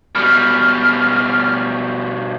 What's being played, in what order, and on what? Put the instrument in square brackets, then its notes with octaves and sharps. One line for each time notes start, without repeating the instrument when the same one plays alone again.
[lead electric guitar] B2 G3 [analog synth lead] F6